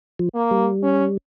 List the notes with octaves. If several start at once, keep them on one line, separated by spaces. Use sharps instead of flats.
F3
A#3
G3
C#4